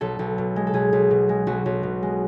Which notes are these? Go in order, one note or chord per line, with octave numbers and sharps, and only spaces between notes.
B1 A4
B1
B2
G#3
A4
B1 G#4
B1
B2
G#3
B1 F#4
B1
B2
G#3